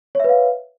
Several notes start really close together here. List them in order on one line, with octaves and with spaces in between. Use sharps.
C#5 E5 B4 F5